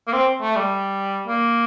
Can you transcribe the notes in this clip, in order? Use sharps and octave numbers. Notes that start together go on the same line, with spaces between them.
A#3
C4
A3
G3
A#3